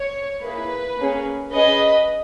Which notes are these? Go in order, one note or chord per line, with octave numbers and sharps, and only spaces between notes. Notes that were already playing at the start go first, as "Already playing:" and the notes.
Already playing: C#5
A#3 E4 G#4 B4
A#3 C#4 G#4
C#4 G#4 B4 D#5